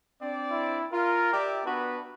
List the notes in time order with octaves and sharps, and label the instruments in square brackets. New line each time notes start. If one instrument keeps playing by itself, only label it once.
[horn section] C4 D4 D5
[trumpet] E4
[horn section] F4 [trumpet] A#4
[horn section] G4 D5 E5
[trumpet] B3 [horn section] D4 F#4 B4